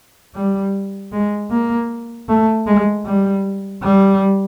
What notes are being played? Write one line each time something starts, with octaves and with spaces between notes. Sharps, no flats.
G3
G#3
A#3
A3
G#3
G3
G3